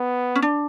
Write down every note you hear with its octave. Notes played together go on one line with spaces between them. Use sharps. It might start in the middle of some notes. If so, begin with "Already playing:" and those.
Already playing: B3
C#4
D4